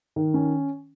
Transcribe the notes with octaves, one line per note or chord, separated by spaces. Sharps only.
D#3
C#4